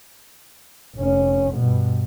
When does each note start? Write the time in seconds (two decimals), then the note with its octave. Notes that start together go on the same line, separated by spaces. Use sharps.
0.96 F1 C#4
1.54 G2 B2